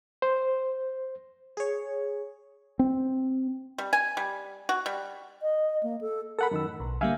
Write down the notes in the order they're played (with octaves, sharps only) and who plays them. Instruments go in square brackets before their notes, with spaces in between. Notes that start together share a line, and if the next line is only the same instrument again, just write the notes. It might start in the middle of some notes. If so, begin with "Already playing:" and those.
[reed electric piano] C5
[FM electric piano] G#4 C#5
[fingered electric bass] C4
[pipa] G3
G#5
G3
F#4
G3
[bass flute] D#5
A#3
A4
[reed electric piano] A4 F#5 B5 [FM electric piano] A#4
[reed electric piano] F#2 D#3 E6
A2
[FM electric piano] B1
[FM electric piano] D3 G3 A#3 [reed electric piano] E5 F5 G#5